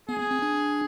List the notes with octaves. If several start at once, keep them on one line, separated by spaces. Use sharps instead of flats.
B3 G#4
B3
C4
D4